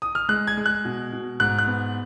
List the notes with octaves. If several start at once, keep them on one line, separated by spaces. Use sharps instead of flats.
D#6
F6
G#3 F#6
G#6
G#3
F#6
B2
B2
G#2 F#6
F#6
B3